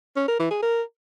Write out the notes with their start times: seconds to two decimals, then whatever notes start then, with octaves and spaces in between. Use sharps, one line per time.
0.16 C#4
0.28 A#4
0.39 E3
0.51 G#4
0.62 A#4